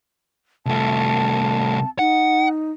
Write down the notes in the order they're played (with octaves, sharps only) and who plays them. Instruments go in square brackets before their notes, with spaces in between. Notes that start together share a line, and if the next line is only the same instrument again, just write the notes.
[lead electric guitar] C2 A3 [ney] A5
[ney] D#4 [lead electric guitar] F#5